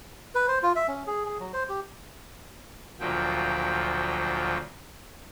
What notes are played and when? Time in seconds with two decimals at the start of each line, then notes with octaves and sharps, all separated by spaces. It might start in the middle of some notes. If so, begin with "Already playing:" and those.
0.35 B4
0.48 C5
0.63 F4
0.76 E5
0.88 C#4
1.07 G#4
1.25 G#4
1.40 F#3
1.53 C5
1.69 G4
3.00 D2 A#2 F3 F#3 G5